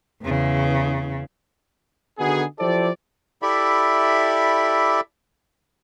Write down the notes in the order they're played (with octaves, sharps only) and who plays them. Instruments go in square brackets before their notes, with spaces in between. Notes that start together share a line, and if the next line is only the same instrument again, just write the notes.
[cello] E2 C#3
[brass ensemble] D3 D#3 B3 D#4 F#4 G#4
F3 E4 G4 A4 C5 D5
[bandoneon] E4 G4 A4 D5 E5 B5